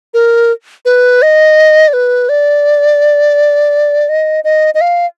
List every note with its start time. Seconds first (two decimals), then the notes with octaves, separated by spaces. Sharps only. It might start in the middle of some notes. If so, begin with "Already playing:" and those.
0.14 A#4
0.85 B4
1.22 D#5
1.88 D5
1.93 B4
2.29 D5
4.09 D#5
4.44 D#5
4.74 D#5
4.81 F5